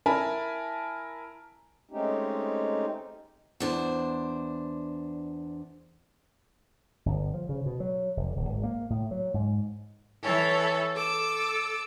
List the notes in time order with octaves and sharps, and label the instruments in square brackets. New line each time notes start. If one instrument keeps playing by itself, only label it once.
[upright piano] E4 A#4 G#5 A5 B5
[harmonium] G#3 A3 C4 C#4 D#4 G4
[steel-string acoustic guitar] E2 D4 C5
[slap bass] G1
F3
C#3
B2
F#3
F1
D1
G#1
A#3
A2
F#3
G#2
[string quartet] E3 A4 C#5
A4 D6 E6